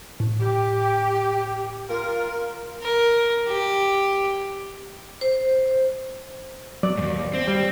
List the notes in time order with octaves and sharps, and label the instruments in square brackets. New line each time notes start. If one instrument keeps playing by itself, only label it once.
[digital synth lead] A2
[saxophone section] G4
F4 A#4
[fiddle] A#4
G4
[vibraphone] C5
[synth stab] F#3 [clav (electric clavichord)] D5
[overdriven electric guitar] D#2 G#2
C4
[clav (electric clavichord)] G3